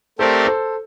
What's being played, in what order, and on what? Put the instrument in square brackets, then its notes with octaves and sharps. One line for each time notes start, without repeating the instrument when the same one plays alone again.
[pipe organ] A3 C4 G4 A#4 D5 [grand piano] A4 C5
[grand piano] A4 C5